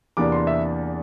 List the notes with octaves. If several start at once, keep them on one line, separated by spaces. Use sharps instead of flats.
E2 C3 E3 A#3 D4 D6
C6
E5